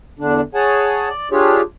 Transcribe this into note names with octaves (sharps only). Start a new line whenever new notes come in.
E2 D3 D4
G#4 C#5 F#5 G#5 A5
D5
D4 F4 G4 G#4 C#5